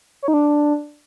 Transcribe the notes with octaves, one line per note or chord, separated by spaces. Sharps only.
C#5
D#4
D4